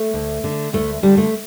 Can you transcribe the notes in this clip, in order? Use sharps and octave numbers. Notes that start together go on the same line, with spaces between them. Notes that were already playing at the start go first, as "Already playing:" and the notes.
Already playing: A3
D2
D3
D2 A3
D3 G3
A3